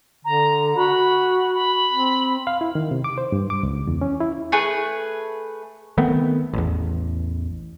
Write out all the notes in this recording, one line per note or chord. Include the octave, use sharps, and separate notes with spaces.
D3 A#5
F#4 B5
B5
C4
F5
E4
D#3
C3
D6
C5
G2
D6
C#2
E2
C#4
E4
A3 G#4 B4
D#3 A3 B3 C4
A1 E2